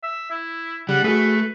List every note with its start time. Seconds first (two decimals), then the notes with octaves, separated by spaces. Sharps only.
0.03 E5
0.31 E4
0.89 C#3 G3 F#5
1.04 A3 F#4 G#4 B4